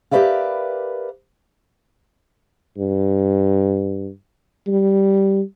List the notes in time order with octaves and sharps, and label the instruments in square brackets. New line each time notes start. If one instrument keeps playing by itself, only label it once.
[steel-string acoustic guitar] G4 A#4 B4 D5 E5 F5
[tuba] G2
G3